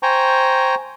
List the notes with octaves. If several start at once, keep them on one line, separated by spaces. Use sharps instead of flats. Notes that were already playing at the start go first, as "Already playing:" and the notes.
C5 G5 G#5 A#5 C#6